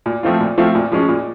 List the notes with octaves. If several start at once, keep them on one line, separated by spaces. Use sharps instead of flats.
A#2
F3 A3 C4 F4
A#2
F3 A3 C4 F4
A#2
F3 G#3 C#4
A#2